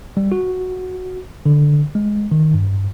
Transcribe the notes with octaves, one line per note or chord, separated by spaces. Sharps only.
G3
F#4
D3
G#3
D#3
G2